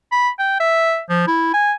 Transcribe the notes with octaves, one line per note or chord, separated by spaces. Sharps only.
B5
G5
E5
F3
E4
G#5